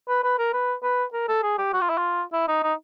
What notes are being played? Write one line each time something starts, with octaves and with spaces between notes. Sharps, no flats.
B4
B4
A#4
B4
B4
A#4
A4
G#4
G4
F#4
F4
E4
F4
E4
D#4
D#4